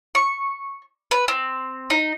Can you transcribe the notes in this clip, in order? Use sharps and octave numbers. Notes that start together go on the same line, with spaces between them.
C#6
B4
C4
D#4